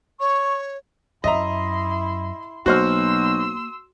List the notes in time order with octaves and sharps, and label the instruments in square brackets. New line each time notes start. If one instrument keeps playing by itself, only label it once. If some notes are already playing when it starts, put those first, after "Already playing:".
[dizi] C#5 [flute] C#6
[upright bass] F#2 [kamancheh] E4 C6 [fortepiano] D#5 E5 A#5
[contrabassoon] B1 [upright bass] A#3 [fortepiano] F#4 C5 F6 [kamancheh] C6 E6